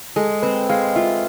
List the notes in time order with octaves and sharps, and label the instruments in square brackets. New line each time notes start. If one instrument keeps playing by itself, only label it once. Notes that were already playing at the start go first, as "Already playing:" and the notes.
[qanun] G#3 [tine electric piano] A4
[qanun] C4 [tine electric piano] B4
[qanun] G#3 [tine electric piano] F5
[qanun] F4 [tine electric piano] E5